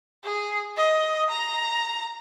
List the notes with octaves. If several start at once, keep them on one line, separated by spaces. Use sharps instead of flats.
G#4
D#5
A#5